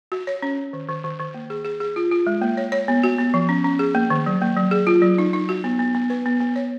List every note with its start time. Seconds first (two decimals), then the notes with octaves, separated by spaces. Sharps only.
0.12 F#4
0.27 C#5
0.42 C#4
0.58 C#4
0.73 D#3
0.89 D#3
1.04 D#3
1.19 D#3
1.34 A#3
1.50 G#4
1.65 G#4
1.80 G#4
1.96 F4
2.11 F4
2.27 G#3
2.42 A#3
2.57 C#5
2.72 C#5
2.88 B3
3.04 F#4
3.18 B3
3.34 F3
3.49 C#4
3.64 C#4
3.79 G#4
3.95 A#3
4.10 D#3
4.26 F#3
4.41 A#3
4.57 F#3
4.71 G#4
4.87 F4
5.02 F#3
5.18 D#4
5.33 D#4
5.49 F#4
5.64 B3
5.79 B3
5.94 B3
6.10 B4
6.26 B3
6.40 B3
6.56 C#5